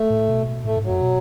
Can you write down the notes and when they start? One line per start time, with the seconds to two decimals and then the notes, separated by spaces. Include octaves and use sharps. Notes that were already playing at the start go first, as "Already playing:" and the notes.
Already playing: A3
0.10 A2
0.29 B2
0.64 A2 A3
0.77 G#2
0.84 F#3
0.90 F#2
1.01 B2